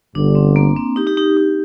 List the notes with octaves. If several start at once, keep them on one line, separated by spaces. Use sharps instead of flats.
G1 G2 D3 D4
C4
A#3
C4
D#4 G4
D#4 G4
D#4 G4
D#4